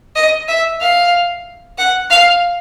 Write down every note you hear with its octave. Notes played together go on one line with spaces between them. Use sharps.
D#5
E5
F5
F#5
F5